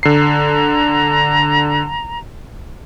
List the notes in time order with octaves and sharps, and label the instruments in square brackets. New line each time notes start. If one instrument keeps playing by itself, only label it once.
[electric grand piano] D3 C7 [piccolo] A#5